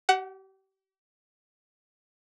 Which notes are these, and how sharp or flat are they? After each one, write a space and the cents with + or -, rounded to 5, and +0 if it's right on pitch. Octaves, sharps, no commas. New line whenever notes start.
G4 -35 F#5 +15